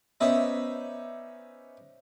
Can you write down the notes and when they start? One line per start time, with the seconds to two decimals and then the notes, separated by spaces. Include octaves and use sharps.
0.21 B3 C#4 D#4 C5 D5 E5